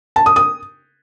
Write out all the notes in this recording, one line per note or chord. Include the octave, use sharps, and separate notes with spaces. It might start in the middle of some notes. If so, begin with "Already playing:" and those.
A5
D#6
D#6